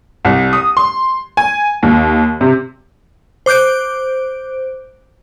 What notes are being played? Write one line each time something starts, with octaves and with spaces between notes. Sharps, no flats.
C2
D#6
C6
G#5
D#2
C3
C5 D6 F#6 G6 D7